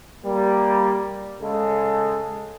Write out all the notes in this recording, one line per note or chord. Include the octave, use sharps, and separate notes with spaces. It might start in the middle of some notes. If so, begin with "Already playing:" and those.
G3 A#3
C#3 G#3 A4